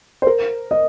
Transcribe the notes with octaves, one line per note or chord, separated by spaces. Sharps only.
C5
A#4
D#5